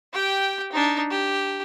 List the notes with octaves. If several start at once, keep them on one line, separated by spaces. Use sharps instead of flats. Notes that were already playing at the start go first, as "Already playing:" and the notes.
G4 G5
D4 D#4
G4